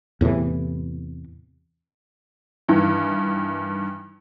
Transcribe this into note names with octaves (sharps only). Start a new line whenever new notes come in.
E2 A2 C3 E3
G2 D#3 E3